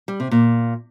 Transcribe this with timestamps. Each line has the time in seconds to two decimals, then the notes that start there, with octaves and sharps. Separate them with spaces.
0.08 G3
0.20 C3
0.31 A#2